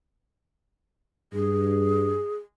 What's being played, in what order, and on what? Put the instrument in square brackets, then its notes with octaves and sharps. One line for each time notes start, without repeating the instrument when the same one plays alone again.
[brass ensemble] G2 [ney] G#4